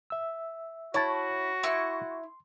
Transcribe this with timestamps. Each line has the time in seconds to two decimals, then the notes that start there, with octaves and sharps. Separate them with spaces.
0.10 E5 E6
0.94 E4 F#4 C#5 A5
1.63 E4 C6 C#6